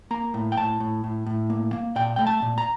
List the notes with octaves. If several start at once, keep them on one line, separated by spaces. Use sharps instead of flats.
A#3 A#5
A2
G5
A2 A5
A2
A2
A2
A#3
A#3
A#2 G5
A3 G5
A5
A#2
A#5